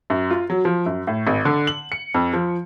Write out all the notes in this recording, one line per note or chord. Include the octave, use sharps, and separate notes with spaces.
F#2
F4
F#3
F3
F#2
A2
G#1
D3
F#7
C#7
F2
F3